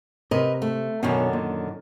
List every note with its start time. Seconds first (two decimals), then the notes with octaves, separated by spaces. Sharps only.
0.31 C3 A#4 B4 D#5
0.62 A3
1.03 F#2 B2 D3 D#3 C#4
1.33 A#2